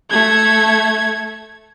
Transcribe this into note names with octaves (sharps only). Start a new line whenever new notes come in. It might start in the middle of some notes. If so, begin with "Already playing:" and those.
A3 G#6